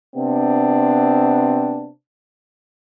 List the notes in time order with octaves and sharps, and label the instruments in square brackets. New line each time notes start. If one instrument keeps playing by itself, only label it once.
[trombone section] C3 B3 C4 D4